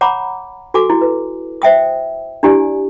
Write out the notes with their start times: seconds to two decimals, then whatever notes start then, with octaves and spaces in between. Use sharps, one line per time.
0.01 C#5 F#5 A#5 B5 D6
0.74 F#4 A4 G#5 D6
0.90 E4 F#4
1.01 B4
1.62 C5 E5 G5 D#6
2.43 D4 E4 G4 D5 G#5